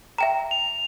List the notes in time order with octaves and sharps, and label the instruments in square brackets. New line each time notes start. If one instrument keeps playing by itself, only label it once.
[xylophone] E5 G5 A#5
[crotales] F7